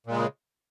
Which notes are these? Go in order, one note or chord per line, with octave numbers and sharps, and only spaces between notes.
A#2 C#3 G#3